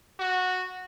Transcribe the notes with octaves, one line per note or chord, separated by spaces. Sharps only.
F#4